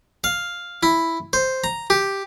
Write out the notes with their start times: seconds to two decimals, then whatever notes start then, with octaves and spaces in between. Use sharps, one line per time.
0.24 F5
0.83 E4
1.33 C5
1.64 A#5
1.90 G4